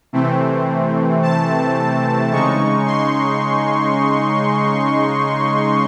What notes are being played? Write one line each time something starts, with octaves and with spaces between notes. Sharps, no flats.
C3 E3 A3 C4
A5
C#3 G#3 D#4 C#6
C6